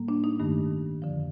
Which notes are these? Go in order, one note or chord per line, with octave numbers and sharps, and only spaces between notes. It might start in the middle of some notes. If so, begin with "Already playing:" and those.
Already playing: A2 G3 A#3
D4
D#4
G2 D#3 A3
F2 D3 F3